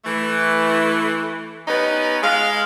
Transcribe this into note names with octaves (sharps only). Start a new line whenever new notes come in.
E3 A3
B3 C#4 D#4 G4 B4
G#3 F5